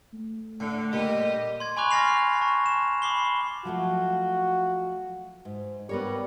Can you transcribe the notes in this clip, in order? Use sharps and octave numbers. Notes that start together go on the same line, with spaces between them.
A3
A2 D3
A#2 G3 G4 D#5
C6 G#6
G#5 B5 C#6 D6 F#6 F7
F6 F#6 A6 A#6 C7 F7
A5 C#6
E7
B5 D6 C7 G7
F3 F#3 A3 F#4
G#2
G3 B3 A#4 C#5